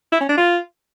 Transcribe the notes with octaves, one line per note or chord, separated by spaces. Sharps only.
E4
C#4
D4
F4